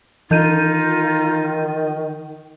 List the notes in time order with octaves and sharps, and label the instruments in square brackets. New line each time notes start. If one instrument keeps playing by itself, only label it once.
[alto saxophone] D#3 [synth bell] E3 G6 D#7 [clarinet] D#4 [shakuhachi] F4